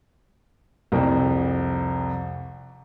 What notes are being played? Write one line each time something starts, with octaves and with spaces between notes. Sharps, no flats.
C2 F2